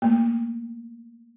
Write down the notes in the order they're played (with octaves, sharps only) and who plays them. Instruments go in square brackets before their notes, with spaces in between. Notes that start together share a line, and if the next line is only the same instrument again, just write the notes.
[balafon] A3 A#3